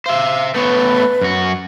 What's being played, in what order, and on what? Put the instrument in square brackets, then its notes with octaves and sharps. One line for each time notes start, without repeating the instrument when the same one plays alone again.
[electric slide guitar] C5 E5 [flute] F5
[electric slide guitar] A3 B3 C#5 [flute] B4
[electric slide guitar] F#2 F#4